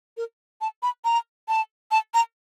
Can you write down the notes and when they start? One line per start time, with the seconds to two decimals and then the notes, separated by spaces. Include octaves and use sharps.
0.17 A#4
0.61 A5
0.83 B5
1.05 A#5
1.48 A5
1.91 A5
2.14 A#5